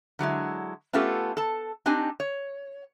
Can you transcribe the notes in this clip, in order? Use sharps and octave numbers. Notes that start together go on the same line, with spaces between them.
D3 F#3 G#3 E4
A3 B3 C#4 F4 G4 A4
A4 A5
C4 D4 D#4 G4 G#5
C#5